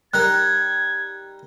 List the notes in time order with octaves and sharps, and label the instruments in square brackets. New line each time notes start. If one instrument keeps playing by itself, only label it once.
[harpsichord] G3 D#4 A#4 [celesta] F#6 [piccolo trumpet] G#6